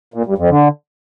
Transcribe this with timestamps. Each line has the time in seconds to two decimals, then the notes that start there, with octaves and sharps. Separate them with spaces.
0.14 A#2
0.26 G2
0.38 F2
0.50 D3